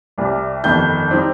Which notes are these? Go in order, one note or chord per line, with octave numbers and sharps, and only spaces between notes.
C2 C3 G3
G1 F2 D#3 G6
G3 C4 D#4